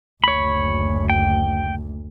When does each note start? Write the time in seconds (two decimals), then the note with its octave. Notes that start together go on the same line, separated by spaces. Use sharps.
0.24 F#1 D2 C#5 B5
1.10 G5